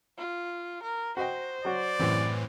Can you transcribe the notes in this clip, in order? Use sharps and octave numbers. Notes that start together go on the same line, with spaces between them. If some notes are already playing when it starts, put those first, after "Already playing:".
F4
A#4
F#4 C5 D#5 G5
F#3 F#4 D5
F#2 A2 C3 E3